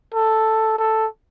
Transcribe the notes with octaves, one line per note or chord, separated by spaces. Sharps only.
A4
A4